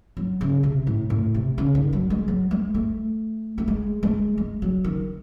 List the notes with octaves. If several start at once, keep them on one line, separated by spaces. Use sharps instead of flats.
F#3
C#3
C3
A2
A2
C3
C#3
D#3
F#3
G#3
F#3
G#3
A3
A3
G#3
G#3
G#3
F#3
D#3